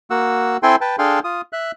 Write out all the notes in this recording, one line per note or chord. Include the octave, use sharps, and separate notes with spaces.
A#3 F#4 F#5 E6
C4 E4 A4 G5 G#5 C6
B4 G5 A5
D4 G#4 A4 F5 G5 C6
F4 D#6
E5 F#6